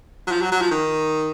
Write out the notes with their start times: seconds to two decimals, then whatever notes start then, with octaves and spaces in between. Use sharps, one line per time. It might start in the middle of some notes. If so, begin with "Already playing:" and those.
0.27 F#3
0.31 F3
0.41 F#3
0.52 F#3
0.61 F3
0.71 D#3